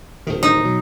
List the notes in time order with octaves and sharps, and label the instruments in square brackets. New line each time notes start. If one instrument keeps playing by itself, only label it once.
[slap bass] D1 D#3
[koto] D#4
[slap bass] B2 F#3